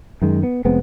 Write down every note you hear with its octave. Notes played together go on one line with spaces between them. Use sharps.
F#2 D#3 G#3
B3
F1 G#3 B3 C4